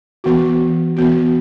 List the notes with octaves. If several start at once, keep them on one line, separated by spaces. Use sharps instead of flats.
E3 B3 F#4
E3 B3 F#4